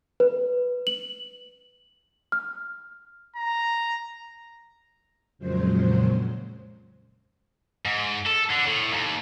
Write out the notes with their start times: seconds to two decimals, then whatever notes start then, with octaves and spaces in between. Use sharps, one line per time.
0.20 B4
0.87 F#7
2.32 F6
3.36 A#5
5.39 F2 A#2 C#3 F#3 G#3 C5
7.85 G#2
8.26 A4
8.50 D3
8.66 A2
8.91 D#2